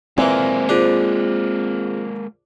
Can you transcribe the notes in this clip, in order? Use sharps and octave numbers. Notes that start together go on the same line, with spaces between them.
A#2 E3 G#3 A#3 C4 G#5
D4 F4 G#4 C5